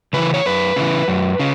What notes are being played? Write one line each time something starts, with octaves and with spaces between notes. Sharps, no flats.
C#3 E3 B4
C#5
F#2 B4
C#3 E3
F#2
C#3